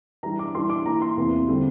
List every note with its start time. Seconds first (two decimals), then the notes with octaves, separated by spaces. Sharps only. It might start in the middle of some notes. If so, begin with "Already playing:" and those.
0.23 E3 G3 D4 A#5
0.39 D6
0.55 E3 G3 D4 C6
0.70 D6
0.86 E3 A#3 E4 A#5
1.02 C6
1.17 E2 C3 E3 A#3
1.48 D3 G3 C4